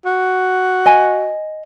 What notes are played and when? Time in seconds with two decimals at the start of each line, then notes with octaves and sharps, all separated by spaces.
0.05 F#4
0.86 D#5 G#5